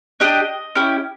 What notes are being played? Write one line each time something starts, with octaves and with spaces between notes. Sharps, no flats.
D4 G4 D#5
C#4 E4 G4